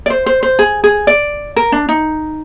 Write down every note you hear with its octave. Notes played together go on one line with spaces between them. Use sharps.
D5
C5
C5
C5
G#4
G#4
D5
A#4
D4
D#4